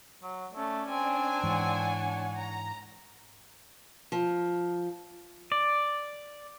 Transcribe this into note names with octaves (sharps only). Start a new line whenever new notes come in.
F#3
A3 C#4 D5
C4 D4 G#5 A5
G#2 E3 C#5 F#5
A#5
F3
D5